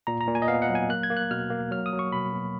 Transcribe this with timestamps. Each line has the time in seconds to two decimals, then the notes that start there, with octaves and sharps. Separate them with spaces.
0.07 A#2 A#5
0.21 A#5
0.28 A#2
0.35 G#5
0.42 D#5
0.48 B3 F5
0.62 F#5
0.69 F#3
0.75 G#5
0.89 A#3 F#6
1.03 G#6
1.10 A#3
1.17 F#6
1.31 B2 F6
1.50 A#3
1.71 F#3 F6
1.86 D#6
1.93 F#3
1.99 C#6
2.12 B2 B5
2.33 B2